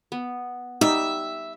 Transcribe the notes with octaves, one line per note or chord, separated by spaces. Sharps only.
B3
G3 D#4 E5